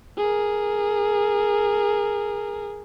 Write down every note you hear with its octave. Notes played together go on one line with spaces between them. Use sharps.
G#4 A#4